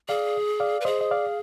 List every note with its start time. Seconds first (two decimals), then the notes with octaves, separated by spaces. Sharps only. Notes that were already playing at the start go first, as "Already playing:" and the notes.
0.08 G#4 D5 F5
0.60 D5 F5
0.81 B4
0.85 G#4 C5 D#5
1.01 D#5
1.11 D5 F5